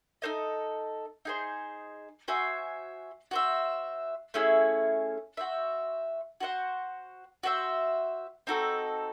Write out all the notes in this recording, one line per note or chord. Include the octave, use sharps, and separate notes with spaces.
D#4 A4 C5 D#5
D#4 G#4 C5
F#4 C5 E5 G#5
F#4 C5 E5
A3 C#4 E4 G#4
F#4 C5 E5
F#4 C5 F#5
F#4 C5 E5
C4 D#4 F#4 A4